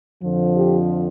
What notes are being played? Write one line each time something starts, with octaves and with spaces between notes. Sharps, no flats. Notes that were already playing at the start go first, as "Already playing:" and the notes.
F2 D3 F3
G4